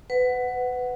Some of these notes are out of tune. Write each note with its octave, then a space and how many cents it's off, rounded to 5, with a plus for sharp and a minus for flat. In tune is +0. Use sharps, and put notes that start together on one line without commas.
B4 +20 F#5 +0